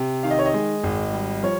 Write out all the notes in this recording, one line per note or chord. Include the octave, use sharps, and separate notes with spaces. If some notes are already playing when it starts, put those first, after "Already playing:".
Already playing: C3
D#3 F5
D#5
C#5
D#5
G#3
G#1
G3
F3 C#5